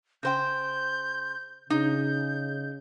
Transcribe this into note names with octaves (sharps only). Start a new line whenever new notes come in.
C#3 C5 G5 G6
C#3 D#4 G6